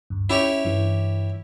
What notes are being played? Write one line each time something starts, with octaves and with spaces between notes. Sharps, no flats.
D2 G2
C#4 E4 G4 C#5
G2 E3